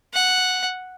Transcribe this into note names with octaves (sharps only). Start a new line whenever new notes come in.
F#5